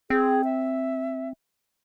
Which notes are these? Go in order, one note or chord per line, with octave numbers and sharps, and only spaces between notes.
C4 G#4
E5